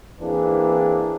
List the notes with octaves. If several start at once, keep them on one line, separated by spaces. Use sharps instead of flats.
E3 A#3 C4 D4 G#4 B4